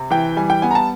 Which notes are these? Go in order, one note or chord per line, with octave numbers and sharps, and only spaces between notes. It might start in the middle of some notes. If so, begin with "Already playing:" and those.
Already playing: C3
E3 G5
G3 G#5
G5
B3 G#5
A#5
A5